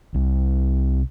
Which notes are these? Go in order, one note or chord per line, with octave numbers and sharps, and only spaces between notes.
C2